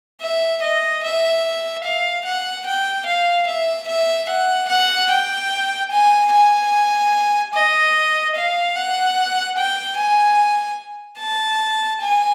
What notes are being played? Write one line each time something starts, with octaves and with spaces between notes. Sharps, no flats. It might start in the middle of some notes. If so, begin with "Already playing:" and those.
E5
D#5
E5
F5
F#5
G5
F5
E5
E5
F#5
F#5
G5
G#5
G#5
D#5
F5
F#5
G5
G#5
A5
G#5